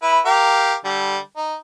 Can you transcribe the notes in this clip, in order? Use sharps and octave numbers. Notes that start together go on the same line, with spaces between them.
E4 B4 B5
G4 A#4 F5
D3 G3
D#4